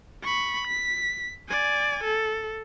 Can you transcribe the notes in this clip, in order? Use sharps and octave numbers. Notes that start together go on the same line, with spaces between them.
B5 C#6
B6
D5 G#5
A4